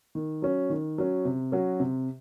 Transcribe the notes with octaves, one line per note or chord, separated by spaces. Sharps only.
D#3
F#3 C#4
D#3
F#3 C#4
C3
F#3 C#4 F#4
C3